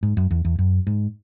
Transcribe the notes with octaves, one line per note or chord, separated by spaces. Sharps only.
G#2
F#2
E2
E2
F#2
G#2